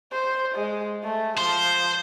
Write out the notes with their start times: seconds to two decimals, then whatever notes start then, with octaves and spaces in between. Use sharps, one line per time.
0.12 C5
0.55 G#3
1.04 A3
1.38 F3 C5